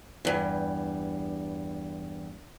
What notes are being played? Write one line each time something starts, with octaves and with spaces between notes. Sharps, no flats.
E2 G2